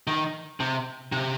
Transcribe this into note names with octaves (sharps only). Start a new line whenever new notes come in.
D#3
C3
C3